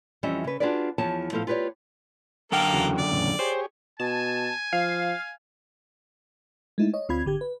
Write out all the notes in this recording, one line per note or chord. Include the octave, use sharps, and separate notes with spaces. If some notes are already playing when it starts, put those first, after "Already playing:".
F2 E3 G3 C#4 D#5 E5
C#3 B4
D4 F4 F#4 G#4 B4 D5
E2 F3 C#5 A5
A2 F3 B3 A4 F5
F4 G4 B4 C#5 D5
F#2 D3 A#3 A4 A#4 G5
E2 C#3 F#4
D5
E2 A2 C#3
G4 G#4 C5 C#5
B2 G#5 A5
F3 F5
G#3 A3 D#4 E4
C#5 D#5
D2 C4 F4 B5 G#6
G#1 D3 G4 G#6
B4